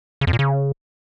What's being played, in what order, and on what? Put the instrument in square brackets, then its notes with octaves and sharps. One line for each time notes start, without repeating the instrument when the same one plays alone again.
[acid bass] C#3
F2
A#2
C#3